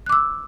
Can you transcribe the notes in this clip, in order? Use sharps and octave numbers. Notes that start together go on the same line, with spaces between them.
D6 E6 F#6